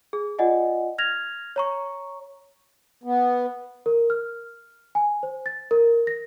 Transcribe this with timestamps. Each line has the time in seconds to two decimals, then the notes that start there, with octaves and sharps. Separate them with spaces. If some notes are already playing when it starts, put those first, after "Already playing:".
0.13 G#4
0.38 F4 D5 D#5 F#5 G#5
0.98 F6 G#6 A#6 F7
1.56 C#5 A#5 C#6
3.04 B3
3.86 A#4
4.10 F6
4.95 G#5
5.23 C5
5.46 A6
5.71 A#4
6.07 A#6